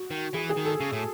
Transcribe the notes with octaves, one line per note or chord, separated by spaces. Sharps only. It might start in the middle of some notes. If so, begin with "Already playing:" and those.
Already playing: F#4
D#3
E3 G#4
G#4
D#3
A4
C#3
A2